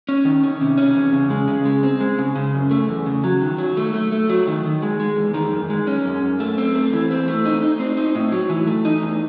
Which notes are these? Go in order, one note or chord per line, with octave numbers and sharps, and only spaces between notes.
C#4
D#3
C#4
C3
C#4
E2
C#3
G#3
C#3
G#3
C4
G#3
C#3
C#3
F#2
A3
E2
C#3
F#3
D#3
F#3
A3
A3
A3
F#3
D#3
D#3
G#3
G#3
E2
D#3
F#2
G#3
C#4
F#2
F#2
A3
C4
A3
E3
C4
A3
D#4
D#4
C4
D#4
A2
F#3
E3
A3
D#4
E2